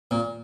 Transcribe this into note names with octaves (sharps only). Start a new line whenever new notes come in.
A#2